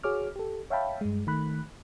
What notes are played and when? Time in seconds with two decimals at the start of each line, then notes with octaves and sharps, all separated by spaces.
0.03 F#4 G#4 C#5 D6 F6
0.36 G4 A4
0.70 C#5 E5 F5 G5 A5 B5
1.01 G2 G#3
1.27 D#3 A3 B5 F#6